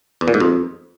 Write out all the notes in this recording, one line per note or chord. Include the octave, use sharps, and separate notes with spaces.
E2
A#2
G#2
F2